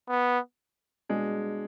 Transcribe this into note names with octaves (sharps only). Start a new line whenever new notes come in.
B3
B2 G#3 D4 G#4